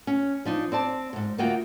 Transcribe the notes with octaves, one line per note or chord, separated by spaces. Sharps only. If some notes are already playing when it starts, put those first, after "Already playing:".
C#4
F3 D4 D#4
C4 D5 A5
G#2 C3
D2 A#3 F4 F#4 G5